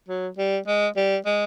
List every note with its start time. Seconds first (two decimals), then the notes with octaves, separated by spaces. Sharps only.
0.08 F#3
0.38 G3
0.67 G#3
0.97 G3
1.26 G#3